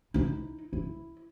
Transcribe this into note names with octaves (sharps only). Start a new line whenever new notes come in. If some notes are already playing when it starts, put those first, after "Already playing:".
D#4 E4
E4